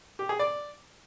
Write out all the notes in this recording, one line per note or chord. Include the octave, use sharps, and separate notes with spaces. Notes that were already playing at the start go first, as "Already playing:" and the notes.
G4
G#4
D5